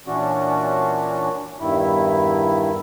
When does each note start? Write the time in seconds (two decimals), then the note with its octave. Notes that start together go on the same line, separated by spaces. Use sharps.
0.07 A#2 E3 C#4 D4 F#4
1.60 E2 G2 D#3 E4